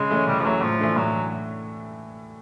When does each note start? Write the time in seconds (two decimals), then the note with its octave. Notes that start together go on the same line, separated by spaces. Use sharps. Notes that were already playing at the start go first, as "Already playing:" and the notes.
Already playing: C#3 G#3
0.11 E3 A3 C#4
0.27 C#3 G3
0.39 F3
0.44 E3 F#3 A3 C#4
0.62 A2 F3
0.80 E3 A3 D4
0.96 A2 F#3
1.13 E3